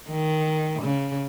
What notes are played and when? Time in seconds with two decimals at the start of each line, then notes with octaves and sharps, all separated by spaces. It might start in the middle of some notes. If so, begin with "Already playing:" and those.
0.10 D#3
0.82 C#3